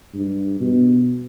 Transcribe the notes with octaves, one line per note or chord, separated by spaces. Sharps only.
G2
B2